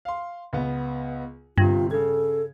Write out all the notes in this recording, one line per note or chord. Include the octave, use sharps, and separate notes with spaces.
F5 C6
C#2 B3
G1 G2 C3 F4
C#3 A4 G#6